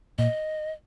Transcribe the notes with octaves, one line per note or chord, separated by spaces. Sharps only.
A#2 D#5